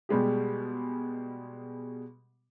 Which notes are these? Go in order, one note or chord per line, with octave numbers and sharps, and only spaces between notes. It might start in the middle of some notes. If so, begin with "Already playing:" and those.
B2 G3 G#3 G4